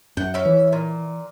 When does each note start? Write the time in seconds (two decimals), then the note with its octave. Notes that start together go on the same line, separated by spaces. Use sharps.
0.17 F#2 F#5 G5
0.34 C#4 E5
0.45 E3
0.72 A#2